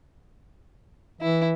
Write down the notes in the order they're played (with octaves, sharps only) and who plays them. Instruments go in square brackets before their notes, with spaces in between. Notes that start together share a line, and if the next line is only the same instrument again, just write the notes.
[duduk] E3 [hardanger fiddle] E4